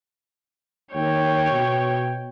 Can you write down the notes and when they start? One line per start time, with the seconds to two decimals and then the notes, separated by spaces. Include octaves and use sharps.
0.94 D#2 C#5 G5
1.51 B2